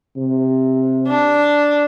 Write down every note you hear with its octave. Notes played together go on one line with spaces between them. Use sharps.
C3
D4